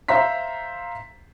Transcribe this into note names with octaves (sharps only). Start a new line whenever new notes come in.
C5 E5 F5 A#5 C6 B6